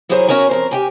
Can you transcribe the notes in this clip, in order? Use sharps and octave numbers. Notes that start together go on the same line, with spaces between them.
F#3 E4 G#4 A#4 C5 C#5
C#4 F#4 A#4 C#5 G#5
F2 A#4 C5
G4 G5 G#5